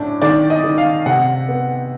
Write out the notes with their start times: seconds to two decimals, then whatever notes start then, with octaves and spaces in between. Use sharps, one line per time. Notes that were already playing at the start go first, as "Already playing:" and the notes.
Already playing: A2 D4
0.22 D#3 D5
0.50 D#5
0.64 D#3
0.78 F5
1.06 C3 F#5
1.49 B3